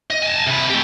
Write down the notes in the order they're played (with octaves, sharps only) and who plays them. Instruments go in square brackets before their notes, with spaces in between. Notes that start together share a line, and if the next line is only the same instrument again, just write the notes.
[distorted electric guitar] D#5
G#5 A5
C3 B4
A3 G4